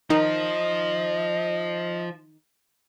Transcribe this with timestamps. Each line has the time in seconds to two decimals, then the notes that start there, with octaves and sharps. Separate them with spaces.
0.10 D#3 F3 D#4 D#5